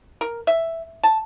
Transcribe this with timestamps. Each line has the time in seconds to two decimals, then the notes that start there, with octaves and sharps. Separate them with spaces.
0.21 A#4
0.47 E5
1.03 A5